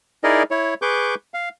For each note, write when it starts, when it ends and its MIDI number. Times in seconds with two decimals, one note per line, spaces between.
0.24 0.43 63
0.24 0.43 64
0.24 0.43 68
0.24 0.43 70
0.24 0.43 74
0.24 0.43 75
0.51 0.74 64
0.51 0.74 73
0.82 1.15 68
0.82 1.15 71
0.82 1.15 85
0.82 1.15 86
0.82 1.15 91
1.34 1.49 77